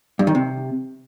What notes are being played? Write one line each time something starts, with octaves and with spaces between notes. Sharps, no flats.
G2
D#3
C3